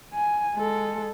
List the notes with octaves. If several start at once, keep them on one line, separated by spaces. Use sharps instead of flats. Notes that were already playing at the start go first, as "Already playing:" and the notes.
G#5
G#3 A4